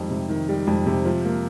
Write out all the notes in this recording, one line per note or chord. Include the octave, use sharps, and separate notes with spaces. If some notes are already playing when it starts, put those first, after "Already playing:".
Already playing: F2 D#3 G3
C3
D#3
G3
F2
C3
F3
A#3